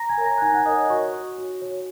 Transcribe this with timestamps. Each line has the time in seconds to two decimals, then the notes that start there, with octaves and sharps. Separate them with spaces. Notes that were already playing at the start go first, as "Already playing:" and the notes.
Already playing: A#5 A#6
0.09 G#5 G#6
0.18 A#4 C#5
0.26 A#5 A#6
0.38 F#6
0.41 D#4 G#5 G#6
0.54 F#5 F#6
0.65 A#4 D#5 D#6
0.70 C#5
0.90 F#4 C#5 C#6
1.13 C#5
1.38 F#4
1.62 C#5